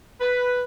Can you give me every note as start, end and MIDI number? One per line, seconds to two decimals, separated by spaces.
0.20 0.62 71